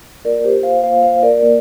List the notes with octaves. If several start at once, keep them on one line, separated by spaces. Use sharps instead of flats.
A#3 F4 A#4 D5
A#4
G4 C5
C5 F5
A#3 F4 C5 F5
C5 F5
A#4 D5
A#3